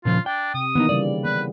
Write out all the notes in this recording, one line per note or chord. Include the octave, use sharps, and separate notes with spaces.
A#2 C#3 F3 F4
D4 G5
C3 D#6
D#3 E3 A#3 B3 C#4 D#4
C#3 G3 D5
B3 B4